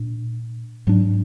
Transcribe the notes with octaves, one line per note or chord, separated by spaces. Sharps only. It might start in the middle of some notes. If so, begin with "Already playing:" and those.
Already playing: A#2 D4
G#2 F#3 D4